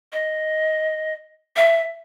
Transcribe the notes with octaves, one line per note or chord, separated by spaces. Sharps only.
D#5
E5